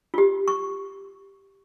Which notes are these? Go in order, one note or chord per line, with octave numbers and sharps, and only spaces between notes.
F4 G4
C#6